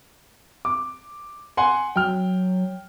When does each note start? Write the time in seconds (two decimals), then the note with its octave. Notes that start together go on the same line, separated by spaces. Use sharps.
0.65 D6
1.57 F#5 G#5 C6
1.96 F#3 G5 F6